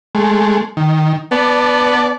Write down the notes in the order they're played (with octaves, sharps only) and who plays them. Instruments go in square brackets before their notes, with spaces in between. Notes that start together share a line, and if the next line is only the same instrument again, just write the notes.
[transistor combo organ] G#3 A3
D#3
[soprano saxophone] B3 [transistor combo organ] D5 A5